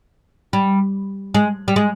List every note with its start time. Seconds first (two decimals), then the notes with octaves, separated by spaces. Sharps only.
0.53 G3
1.34 G#3
1.68 G3
1.76 G#3